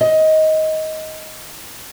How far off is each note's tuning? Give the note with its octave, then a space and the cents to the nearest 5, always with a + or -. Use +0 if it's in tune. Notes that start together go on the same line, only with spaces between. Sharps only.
D#5 +15